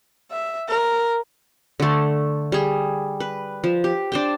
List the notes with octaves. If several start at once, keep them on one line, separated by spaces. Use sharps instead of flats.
E5
A#4
D3 A3
G3 G#4
B4
F3
G4
D4 C5 G5